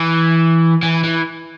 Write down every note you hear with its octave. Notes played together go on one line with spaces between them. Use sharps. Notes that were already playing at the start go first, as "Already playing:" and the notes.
Already playing: E3
E3
E3